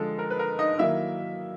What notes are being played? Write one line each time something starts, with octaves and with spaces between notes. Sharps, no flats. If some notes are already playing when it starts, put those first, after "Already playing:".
Already playing: D3 F3 G#3 A4
A#4
B4
A#4
D#4 D#5
D#3 F#3 A#3 E4 E5